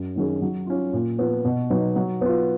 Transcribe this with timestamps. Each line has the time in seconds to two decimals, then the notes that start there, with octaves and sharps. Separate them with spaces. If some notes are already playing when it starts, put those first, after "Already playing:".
Already playing: F#2
0.16 D#3 F#3 C#4 G#4
0.42 F#3
0.67 C#4 F4
0.93 A#2
1.19 F3 B3
1.45 B2
1.70 F#3 B3 D#4
1.96 F#3
2.21 B3 F4